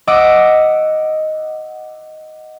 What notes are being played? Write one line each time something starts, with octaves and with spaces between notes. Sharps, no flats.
D#5 F#5 D6 E6 A#6 D7